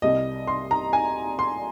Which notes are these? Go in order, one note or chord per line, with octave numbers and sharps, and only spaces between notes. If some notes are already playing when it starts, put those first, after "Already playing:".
C2 C3 G3 D#5
C6
A#5
G#5
C6